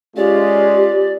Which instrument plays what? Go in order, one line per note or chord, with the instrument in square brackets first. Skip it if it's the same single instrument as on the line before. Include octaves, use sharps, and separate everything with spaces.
[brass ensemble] G#3 C#4 F4 [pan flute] G4 [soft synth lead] D5